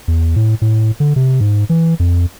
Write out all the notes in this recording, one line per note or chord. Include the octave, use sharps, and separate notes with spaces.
E2
A2
A2
D3
C3
G#2
E3
F2